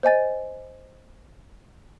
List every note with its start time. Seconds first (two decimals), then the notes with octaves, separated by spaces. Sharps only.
0.03 C5 D#5 G#5 A6